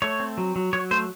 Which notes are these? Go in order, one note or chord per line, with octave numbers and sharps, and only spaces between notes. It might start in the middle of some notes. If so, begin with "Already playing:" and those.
A3 C#5
C4
F#3
F#3
F#3 C#5
A3 C5